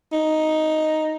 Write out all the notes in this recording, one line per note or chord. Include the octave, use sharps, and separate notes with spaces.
D#4